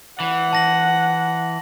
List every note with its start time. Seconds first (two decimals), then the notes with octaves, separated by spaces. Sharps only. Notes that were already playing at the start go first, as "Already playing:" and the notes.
0.20 E3 F#5
0.53 A5 A#6 F#7